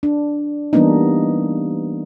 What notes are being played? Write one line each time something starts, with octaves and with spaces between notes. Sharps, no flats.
D4
E3 G3 A#3 B3 D4 D#4